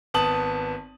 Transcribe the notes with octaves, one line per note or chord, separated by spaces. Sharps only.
G#1 B3 A5 D#6 F#7